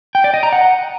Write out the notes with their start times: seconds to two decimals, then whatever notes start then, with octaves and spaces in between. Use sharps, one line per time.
0.15 G5
0.24 D5
0.34 D#5
0.43 A#5
0.53 F#5